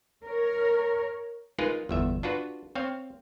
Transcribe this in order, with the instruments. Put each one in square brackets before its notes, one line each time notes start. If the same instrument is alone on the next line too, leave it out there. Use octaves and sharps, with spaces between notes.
[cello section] A#4 C#5
[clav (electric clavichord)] G#3 D#4 F4 G#4 A#4 B4
G1 E2 E5
D4 F4 F#4 B4
C4 C#5 F5